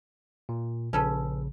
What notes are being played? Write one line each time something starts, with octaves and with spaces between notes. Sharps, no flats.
A#2
A#1 C#3 C#4 A4 B4